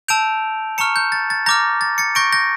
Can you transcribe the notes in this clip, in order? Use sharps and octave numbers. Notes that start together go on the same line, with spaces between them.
A5 E6 G6 D7 F7
A#5 C#6 F6 C#7 E7
G6
A6
A6
A#5 D6 F6 G6 A#6
A6
A6 C#7
C#6 G6 A#6 D7
G6 A#6